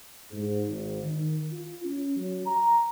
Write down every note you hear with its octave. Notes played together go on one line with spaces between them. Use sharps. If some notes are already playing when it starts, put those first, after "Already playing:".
G#2
G#1
D#3
F4
C#4
F#3
A#5